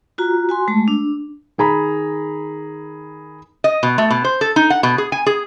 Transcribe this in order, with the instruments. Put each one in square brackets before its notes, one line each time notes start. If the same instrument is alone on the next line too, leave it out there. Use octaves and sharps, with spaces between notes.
[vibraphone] F4 F#4 A#5
F#4 G#5 C6
G#3 A3 A5
D4
[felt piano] D#3 G#4 A#5 B5
[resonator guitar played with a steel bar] D#5
B2
A3
B2
C5
A4
D#4
F#5
B2
G#4
G#5
G#4